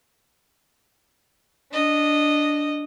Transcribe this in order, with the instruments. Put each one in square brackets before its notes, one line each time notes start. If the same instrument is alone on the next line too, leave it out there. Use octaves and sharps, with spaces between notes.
[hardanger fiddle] D4 D#5